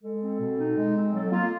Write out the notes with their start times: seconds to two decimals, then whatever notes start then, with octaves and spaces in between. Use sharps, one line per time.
0.03 G#3 A4
0.22 C4
0.40 B2
0.58 D#4
0.77 G#3
0.95 C4
1.14 F#3 A4
1.31 A#3 F4